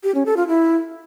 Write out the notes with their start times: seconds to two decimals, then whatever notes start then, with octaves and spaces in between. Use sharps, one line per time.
0.04 G4
0.15 C#4
0.26 A4
0.37 F4
0.48 E4